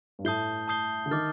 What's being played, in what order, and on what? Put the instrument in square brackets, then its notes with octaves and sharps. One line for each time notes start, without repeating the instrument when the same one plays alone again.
[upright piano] G2
[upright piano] A2 [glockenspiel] A5 D#6 G6 C7 G7
[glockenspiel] A5 D#6 G6 C7 G7
[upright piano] D3
[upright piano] D#3 [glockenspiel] D6 F6 A6